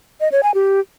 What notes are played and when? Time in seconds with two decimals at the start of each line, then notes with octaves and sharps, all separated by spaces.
0.20 D#5
0.32 C#5
0.43 G#5
0.54 G4